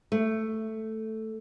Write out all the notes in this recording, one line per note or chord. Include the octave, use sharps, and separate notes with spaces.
A3